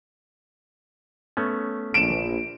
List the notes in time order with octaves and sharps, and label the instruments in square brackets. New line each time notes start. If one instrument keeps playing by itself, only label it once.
[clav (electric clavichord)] A3 B3 C#4
[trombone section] A#1 [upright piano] D7 E7